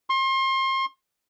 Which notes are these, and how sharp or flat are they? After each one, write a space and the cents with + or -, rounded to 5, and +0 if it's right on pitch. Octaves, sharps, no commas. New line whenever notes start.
C6 +35